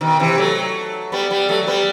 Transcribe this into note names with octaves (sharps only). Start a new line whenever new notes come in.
B2 D#3
C3 E3
F#3 A3
G3 B3
G3 B3
F#3 A3
A3
G3 B3